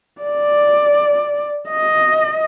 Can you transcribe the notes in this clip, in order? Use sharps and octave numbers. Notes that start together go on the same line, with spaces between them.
D5
D#5